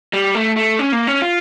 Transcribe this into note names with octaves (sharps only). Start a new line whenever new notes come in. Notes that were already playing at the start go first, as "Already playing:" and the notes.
G3
A3
A3
C#4
A#3
C#4
F4